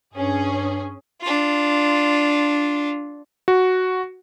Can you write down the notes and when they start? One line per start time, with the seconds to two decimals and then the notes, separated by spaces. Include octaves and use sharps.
0.14 G2 C#4 G#4
1.21 D4 F4
3.48 F#4